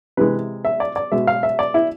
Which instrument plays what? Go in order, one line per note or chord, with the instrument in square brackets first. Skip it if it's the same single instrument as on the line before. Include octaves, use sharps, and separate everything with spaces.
[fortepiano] C3 E3 G#3 B4
E5
D5
D5
B2 G#3 E5
F5
E5
D5
E4